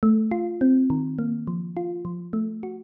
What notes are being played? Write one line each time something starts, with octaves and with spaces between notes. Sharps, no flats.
A3
F4
C4
D#3
A#3
F3
F4
F3
A3
F#4